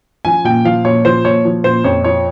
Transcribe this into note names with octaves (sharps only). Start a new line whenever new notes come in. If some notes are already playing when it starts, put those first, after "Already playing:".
F3 G#5
A#2 G5
F3 F5
A#2 C#5
F3 C5
A#2 C#5
F3
A#2 C5
F2 C#5
F3 C#5